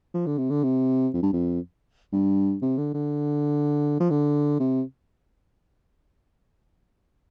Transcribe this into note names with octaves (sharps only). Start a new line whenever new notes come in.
F3
D3
C3
D3
C3
F2
G2
F2
G2
C3
D3
D3
F3
D3
C3